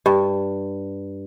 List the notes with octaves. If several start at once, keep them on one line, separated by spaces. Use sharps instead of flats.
G2